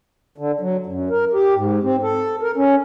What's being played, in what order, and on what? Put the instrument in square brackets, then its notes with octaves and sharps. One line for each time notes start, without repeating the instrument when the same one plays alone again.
[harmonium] D3
F#3
F#2
A#4
G4
G#2
C4
A4
A#4
C#4